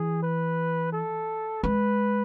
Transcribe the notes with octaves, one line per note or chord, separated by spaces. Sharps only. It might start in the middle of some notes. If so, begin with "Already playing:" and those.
Already playing: E3 G#4
B4
A4
G#3 B4